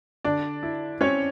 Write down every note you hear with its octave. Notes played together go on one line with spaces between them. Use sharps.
D3 D4 D5
E4
C4 C#4 C#5